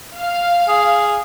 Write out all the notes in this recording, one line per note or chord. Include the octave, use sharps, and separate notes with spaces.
F5
G#4